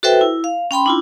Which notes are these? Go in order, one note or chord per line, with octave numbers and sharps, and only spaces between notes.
F#4 A4 B4 C5 E5 G5
E4
F5
C#4 G5 B5 C6
D4 E4 F4